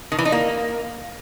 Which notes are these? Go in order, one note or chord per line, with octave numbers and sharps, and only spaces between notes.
D#3
E3
D#4
A#3